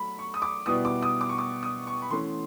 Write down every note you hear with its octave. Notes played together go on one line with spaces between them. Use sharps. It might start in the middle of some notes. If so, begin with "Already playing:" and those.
Already playing: F#3 A3 B5
C#6
D#6
D6
B2 G3 B3 E4 D#6
D6
D#6
D6
C#6
D6
D#6
C#6
B5
E3 A3 C#4 C6